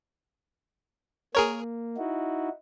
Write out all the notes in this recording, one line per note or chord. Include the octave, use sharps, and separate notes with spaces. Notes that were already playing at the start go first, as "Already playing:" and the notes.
A#3 G#4 A#4 C#5
D#4 E4 F#4